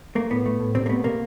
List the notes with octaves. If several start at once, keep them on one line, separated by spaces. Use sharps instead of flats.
A3 A#3
A2 B3
A3
A2
C3 C4
A#3
A3 B3
C3 A#3